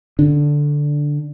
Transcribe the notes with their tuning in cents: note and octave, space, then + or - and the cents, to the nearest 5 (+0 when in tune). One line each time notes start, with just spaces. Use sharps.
D3 +0 D4 -5